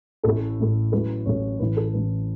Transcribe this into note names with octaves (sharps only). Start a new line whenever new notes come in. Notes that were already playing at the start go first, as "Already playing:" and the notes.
A1 A2 A3 A4
A1 A2 A3
A1 A2 F#3 A3 B4
A1 A2 F#3 A3 C#5
A1 A2 E3 B4
A4
A1 A2 E3 B4